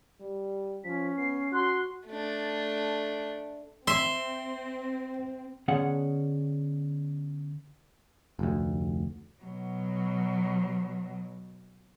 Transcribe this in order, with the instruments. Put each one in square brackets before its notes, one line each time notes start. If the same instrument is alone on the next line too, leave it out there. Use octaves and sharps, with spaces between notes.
[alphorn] G3
[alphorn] F3 [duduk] C#4 [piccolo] B6
[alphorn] B3 [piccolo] C7
[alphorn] F#4 [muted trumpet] C6 [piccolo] F#6
[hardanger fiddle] A3 D4
[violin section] C4 [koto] E5 [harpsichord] C6
[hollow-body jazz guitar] D3 B3 C#4 G#4 F#5
[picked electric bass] F1 D2
[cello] B2 F#3